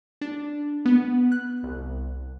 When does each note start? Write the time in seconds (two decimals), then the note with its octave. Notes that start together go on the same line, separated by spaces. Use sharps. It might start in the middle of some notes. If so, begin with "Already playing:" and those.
0.21 D4
0.85 B3
1.32 F#6
1.63 C2